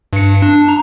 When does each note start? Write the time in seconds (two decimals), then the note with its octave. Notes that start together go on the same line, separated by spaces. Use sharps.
0.13 G2 C#7
0.42 D4
0.68 A#5